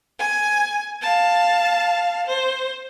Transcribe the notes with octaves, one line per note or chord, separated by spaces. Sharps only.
G#5
F5 A5
C5